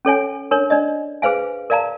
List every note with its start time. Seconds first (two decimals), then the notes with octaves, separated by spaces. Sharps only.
0.05 C#4 A4 C#5 G#5
0.51 D4 A#4 C#5
0.70 D4 D5 D#5
1.22 G#4 B4 C5 F5 G#5
1.70 A#4 D5 F5 A5 A#5